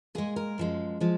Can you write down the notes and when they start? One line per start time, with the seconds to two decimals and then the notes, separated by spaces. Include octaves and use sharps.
0.15 A#2 G#3 G#4
0.36 A#4
0.58 F#2 F3 G#3
1.00 F3 G#3